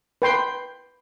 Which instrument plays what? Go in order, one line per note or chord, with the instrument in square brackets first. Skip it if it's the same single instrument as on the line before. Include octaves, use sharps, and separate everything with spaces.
[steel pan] B4 G5 C6